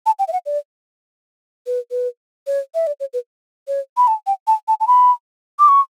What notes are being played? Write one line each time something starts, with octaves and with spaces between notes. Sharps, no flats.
A5
G5
E5
F#5
D5
B4
B4
C#5
E5
D5
C#5
B4
C#5
B5
A5
G5
A5
A5
A5
B5
D6
C#6